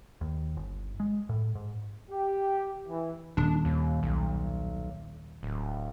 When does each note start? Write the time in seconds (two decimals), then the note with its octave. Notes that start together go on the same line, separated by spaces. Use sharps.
0.21 D#2
0.57 G1
1.00 G#3
1.29 A2
1.55 G#2
2.11 G4
2.87 E3
3.37 D#1 D4
3.65 D#2
4.03 B1
5.43 D1